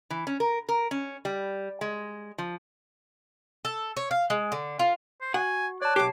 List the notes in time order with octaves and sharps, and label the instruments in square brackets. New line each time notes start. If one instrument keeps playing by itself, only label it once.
[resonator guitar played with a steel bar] E3
C#4
A#4
A#4
C#4
G3
G#3
F3
[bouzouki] A4
C#5
F5
G#3
D3
F4
[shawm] C5
[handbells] F#4 [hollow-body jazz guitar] F#5 [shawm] G#5
[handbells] C#5 A5 [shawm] D5 [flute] F#6
[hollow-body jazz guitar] B1 G4 [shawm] D6 [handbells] C7